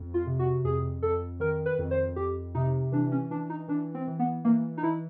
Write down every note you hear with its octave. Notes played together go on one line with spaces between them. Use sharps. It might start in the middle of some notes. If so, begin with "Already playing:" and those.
Already playing: F2
F4
C3
F#4
F2 G#4
F2 A4
D#3 A#4
B4
F2
C5
F2 G4
C3 D#4
E3 D4
C#4
E3 D4
D#4
E3 D4
C4
E3
B3
E3 A#3
D#4
E3 E4